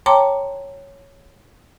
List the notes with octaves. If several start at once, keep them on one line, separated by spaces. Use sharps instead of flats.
C#5 G5 A5 A#5 C6 D6